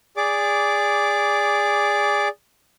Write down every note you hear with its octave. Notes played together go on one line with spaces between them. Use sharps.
G#4 D5 D6